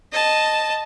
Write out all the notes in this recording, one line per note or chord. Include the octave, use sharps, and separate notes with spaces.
D#5 A5